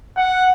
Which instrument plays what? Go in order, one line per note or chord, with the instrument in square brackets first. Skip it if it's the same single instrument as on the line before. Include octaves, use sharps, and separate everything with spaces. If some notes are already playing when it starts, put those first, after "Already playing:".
[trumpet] F#5